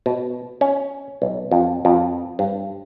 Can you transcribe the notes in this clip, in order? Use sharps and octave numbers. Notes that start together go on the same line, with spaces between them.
B2
C#4
B1
F2
F2
G2